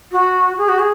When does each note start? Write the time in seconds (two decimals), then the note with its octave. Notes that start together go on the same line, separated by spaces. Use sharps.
0.11 F#4
0.57 G#4
0.68 F#4
0.79 G#4